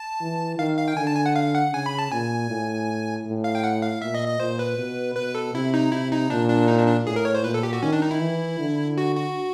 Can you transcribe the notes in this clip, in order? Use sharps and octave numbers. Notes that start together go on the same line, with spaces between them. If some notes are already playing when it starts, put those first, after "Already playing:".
Already playing: A5
E3
D#3 F5
F5
G5
D3 G#5
A5
G#5
F#5
F5
F#5
C#3 G#5
B5
A5
A#2 G#5
A2
A2
F5
G5
F#5
F5
A#2 E5
D#5
D#5
A#2 C5
B4
B2
B2 B4
A4
C3 E4
D#4
C3 E4
D#4
A#2 D4
D4
D#4
D4
D4
A2 G#4
A#4
C#5
C5
A#2 B4
A4
G4
F#4
D#3 C#4
D4
D#4
E4
E3
D3
F#4
F#4